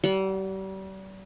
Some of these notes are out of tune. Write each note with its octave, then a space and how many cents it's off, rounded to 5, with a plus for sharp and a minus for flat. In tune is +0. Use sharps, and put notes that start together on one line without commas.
G3 -35 F#5 +0